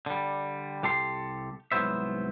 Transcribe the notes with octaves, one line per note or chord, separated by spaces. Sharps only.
D3 G3
C2 G4 A4 C6
C2 G#2 F#3 B3 C5 E5